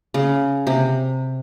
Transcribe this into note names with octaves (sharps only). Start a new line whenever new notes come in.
C#3
C3